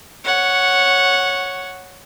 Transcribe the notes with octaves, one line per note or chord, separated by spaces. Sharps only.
C#5 F#5